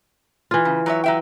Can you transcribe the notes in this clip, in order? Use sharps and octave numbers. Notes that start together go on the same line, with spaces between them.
E3 F4
C#3
F#3 C#5 E5
F#3 E5 G5